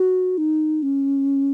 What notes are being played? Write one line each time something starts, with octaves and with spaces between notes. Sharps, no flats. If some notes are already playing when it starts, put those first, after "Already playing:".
Already playing: F#4
D#4
C#4